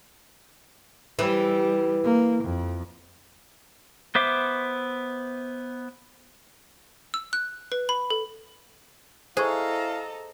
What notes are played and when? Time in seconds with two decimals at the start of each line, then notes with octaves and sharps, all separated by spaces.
1.19 E3 G3
2.04 A#3
2.44 F2
4.15 B3 C5 E5 D6
7.14 E6
7.33 F#6
7.72 B4
7.89 B5
8.10 A4
9.37 E4 G#4 A4 C5 D#5 F5 A#5 C#6